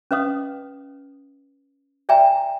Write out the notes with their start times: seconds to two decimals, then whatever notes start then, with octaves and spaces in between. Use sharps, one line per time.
0.11 C#4 B4 D#5 F5 D#6
2.09 D5 E5 G5 G#5 A#5